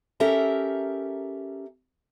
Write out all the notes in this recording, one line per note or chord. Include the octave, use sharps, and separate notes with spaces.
C#4 G4 A4 A#4 E5 A#5